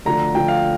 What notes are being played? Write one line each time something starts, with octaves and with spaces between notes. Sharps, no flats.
D2 D3 F3 A#5
D2 D3 F3 G5
F5